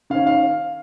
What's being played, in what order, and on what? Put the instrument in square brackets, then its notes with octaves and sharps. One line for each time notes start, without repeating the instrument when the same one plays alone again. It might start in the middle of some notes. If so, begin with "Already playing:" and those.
[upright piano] D#3 C#4 F5
F5